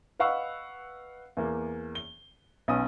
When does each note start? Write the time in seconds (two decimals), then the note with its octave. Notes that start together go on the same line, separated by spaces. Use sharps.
0.19 B4 D#5 F5 F#5 C#6 E6
1.37 E2 A#3
1.95 G7
2.68 B1 B3 C#4 D#6